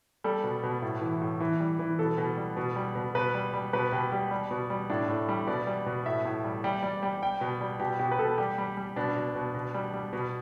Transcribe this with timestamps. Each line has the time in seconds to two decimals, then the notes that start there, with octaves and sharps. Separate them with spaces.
0.24 G3 A4
0.44 B2
0.63 B2
0.82 A2
1.02 E3
1.21 A2
1.40 E3
1.60 G3
1.79 E3
1.99 B2 A4
2.18 B2
2.37 G3
2.57 B2
2.76 G3
2.95 B2
3.15 B2 B4
3.34 G3
3.54 G3
3.73 B2 B4
3.92 B2 G4
4.12 G3 G4
4.31 G3
4.51 B2
4.70 G3
4.90 A2 D4
5.09 A2
5.29 G3
5.47 B2 D5
5.67 G3
5.86 B2
6.06 A2 E5
6.25 A2
6.44 G3
6.64 G3 G5
6.83 G3 D5
7.02 G3 G5
7.22 G3 G5
7.41 B2
7.61 G3
7.80 B2 G4
7.99 B2 G4
8.11 B4
8.19 B2 A4
8.38 G3 G4
8.58 G3
8.77 G3
8.96 B2 D4
9.16 B2
9.35 B2
9.54 B2
9.74 G3
9.94 G3
10.13 B2